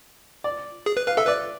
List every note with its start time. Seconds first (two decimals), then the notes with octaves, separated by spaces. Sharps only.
0.44 D5
0.86 G#4
0.97 B4
1.07 B4 F5
1.17 A4 E5
1.27 B4 D5